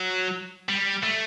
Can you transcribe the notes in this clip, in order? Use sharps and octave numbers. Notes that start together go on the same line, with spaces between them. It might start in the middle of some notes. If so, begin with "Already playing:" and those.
Already playing: F#3
G3
A3